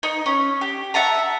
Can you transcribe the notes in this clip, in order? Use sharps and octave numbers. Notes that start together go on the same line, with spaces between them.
D#4
C#4
G4
E5 F#5 A5 A#5